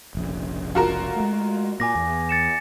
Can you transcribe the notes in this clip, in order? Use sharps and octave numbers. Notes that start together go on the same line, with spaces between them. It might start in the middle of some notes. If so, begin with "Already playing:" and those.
F1 A#1 C#3
F4 F#4 A#4
G#3 A3
A#2 A#3 G#5 D6 A#6
E2
A6 C#7 E7